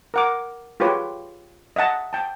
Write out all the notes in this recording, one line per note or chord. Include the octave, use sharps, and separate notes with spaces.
A#4 F#5 D6
F4 G4 G#4 B4 C#5
D#5 E5 F#5 A5
G5 A5